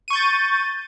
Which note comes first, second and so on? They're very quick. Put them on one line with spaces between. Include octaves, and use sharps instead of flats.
D#7 C#6 G6 A6